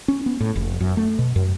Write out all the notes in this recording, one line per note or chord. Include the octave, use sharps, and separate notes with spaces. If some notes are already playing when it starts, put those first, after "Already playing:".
C#4
B3
A2
F1
F#2
A3
B2
F#2